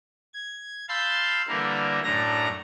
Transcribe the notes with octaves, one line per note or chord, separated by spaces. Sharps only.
G#6
F5 A5 B5 C6 E6 G6
D3 E3 G3 A#3 E4 A#4
F#2 A2 A3 D4 A#5 A#6